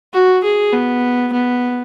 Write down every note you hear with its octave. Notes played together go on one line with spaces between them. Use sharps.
F#4
G#4
B3
B3